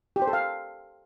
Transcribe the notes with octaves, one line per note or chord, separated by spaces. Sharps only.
G4
C5
A4
F5